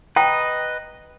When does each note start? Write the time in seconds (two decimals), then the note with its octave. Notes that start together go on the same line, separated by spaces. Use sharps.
0.16 B4 D#5 G5 A#5